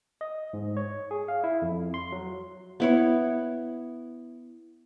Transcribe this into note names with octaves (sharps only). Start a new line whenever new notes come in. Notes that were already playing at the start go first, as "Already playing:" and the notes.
D#5
G#2
C#5
G#4
F5
E4
F2
C6
F#3
B3 E4 C#5